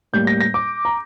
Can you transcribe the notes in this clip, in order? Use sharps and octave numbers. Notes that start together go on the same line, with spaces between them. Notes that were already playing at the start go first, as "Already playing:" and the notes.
A2 G3 A#3 G6
A#6
A#6
D6
A#5